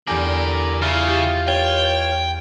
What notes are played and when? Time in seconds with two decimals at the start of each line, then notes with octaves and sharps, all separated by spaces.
0.07 E2 D3 G4 A#4 D5 G#5
0.82 C#3 E4 F4
1.08 G4
1.48 C#5 G5